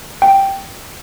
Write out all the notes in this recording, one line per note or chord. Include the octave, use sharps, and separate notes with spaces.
G5